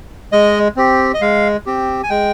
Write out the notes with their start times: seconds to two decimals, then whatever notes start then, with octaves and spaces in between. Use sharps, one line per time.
0.32 G#3 D#5
0.76 C4 G4
1.14 D#5
1.21 G#3 F5
1.66 C4 G4
2.03 G#5
2.10 G#3 G5